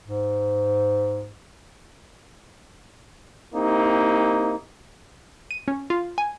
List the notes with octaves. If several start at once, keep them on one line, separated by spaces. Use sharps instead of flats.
G#2
A#3 C4 D#4 E4 G4
D#7
C#4
F4
G#5